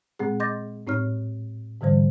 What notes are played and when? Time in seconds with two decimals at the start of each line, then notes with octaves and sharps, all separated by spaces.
0.19 A#2 G#3 C4 G#4
0.40 D#5 C6 D6 G6 A6 A#6
0.87 A2 C4 D#4 C#5 F6
1.81 G#2 D3 E3 G3 C5